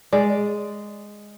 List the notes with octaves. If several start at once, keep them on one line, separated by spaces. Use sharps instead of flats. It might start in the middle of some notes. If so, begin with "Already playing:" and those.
G#3 D5